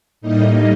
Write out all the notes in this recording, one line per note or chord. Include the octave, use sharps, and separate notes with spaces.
A2 G3 A#3 D#4 D#5